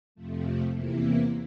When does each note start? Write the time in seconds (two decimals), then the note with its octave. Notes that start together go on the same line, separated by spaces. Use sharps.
0.15 F2 C3 F3 A3
0.73 E2 C3 E3 A#3 E4